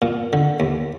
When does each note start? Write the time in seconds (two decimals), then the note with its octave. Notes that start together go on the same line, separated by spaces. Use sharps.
0.02 A#2
0.33 D3
0.60 D#2